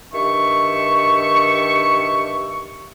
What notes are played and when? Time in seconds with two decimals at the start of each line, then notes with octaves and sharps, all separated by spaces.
0.13 G2 D#3 E5 C#6